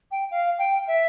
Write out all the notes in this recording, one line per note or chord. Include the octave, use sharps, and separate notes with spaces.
G5
F5
G5
E5